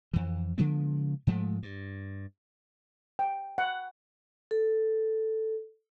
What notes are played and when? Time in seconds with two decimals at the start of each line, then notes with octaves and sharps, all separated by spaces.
0.14 F2 E3
0.58 C#3 F3 G#3 B3
1.27 G#2 F3 G#3 A3
1.63 G2
3.19 G5
3.58 F#5
4.51 A4